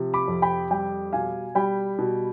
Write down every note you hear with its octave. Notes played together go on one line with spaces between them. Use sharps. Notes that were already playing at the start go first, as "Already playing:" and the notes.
Already playing: C3 F3
B5 D6
F2
G5 B5
G3 G5
B2 F5 G#5
G3 G5 B5
B2